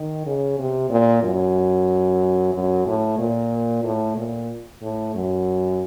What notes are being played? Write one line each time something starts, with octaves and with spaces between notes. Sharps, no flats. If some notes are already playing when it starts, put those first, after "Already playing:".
Already playing: D#3
C#3
C3
A#2
F#2
F#2
A2
A#2
A2
A#2
A2
F#2